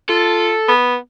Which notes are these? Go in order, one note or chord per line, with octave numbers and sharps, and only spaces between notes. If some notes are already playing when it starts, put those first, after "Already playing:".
F4 A4
B3